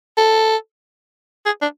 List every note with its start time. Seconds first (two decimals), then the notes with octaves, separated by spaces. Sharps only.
0.17 A4
1.46 G#4
1.62 D4